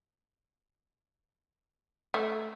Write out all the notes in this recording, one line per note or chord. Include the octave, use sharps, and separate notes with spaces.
A3